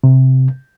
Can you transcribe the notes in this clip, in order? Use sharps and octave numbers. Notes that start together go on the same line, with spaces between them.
C3